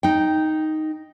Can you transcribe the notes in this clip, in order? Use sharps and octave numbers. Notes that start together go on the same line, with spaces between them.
D#4 G5